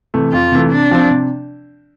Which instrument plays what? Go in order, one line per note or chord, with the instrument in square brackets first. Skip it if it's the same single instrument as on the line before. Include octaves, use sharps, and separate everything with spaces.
[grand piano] C3 E3 A3
[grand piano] F2 [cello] F4
[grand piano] C3 E3 A3
[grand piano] C3 [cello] D4
[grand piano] F3 C4
C3